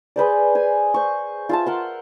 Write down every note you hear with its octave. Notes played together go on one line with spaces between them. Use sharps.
G#4 B4 C5 D5
C5 G#5
C5 C#6
F4 E5 A5
A#4 F#5 C6